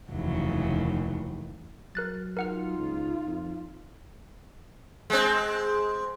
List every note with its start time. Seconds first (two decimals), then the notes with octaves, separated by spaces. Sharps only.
0.10 F1 D#2 C#3 E3 F#3
1.95 F#3 A#4 F#6 A6
2.37 D#4 F4 A#4 F#5 F6
2.78 C#2
3.26 F2
5.10 G#3 C4